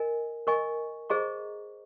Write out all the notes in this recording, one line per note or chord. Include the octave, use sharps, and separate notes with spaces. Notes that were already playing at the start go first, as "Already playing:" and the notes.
Already playing: A#4 D#5 G#5
A#4 D#5 G#5 C#6
G#4 C5 D#5 A#5 C#6